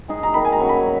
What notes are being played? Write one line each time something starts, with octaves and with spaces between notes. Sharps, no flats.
G#3 D#4 G#4
A#5
D#3 B5
G#5
A#5
F#3 C#4
B5